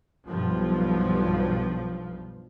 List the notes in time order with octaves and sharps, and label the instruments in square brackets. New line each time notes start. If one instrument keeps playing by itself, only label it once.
[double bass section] B1 G2 F3